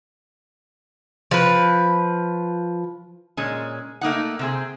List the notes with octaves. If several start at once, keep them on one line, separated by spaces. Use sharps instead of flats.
F3 B4
A#2 G#3 C#4
A3 A#3 D#4 F#5
C3 C4 G#4